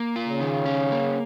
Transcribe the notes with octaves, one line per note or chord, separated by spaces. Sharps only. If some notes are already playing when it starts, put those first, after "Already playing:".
Already playing: A#3
F4
C#3
D#3
C#4
A#3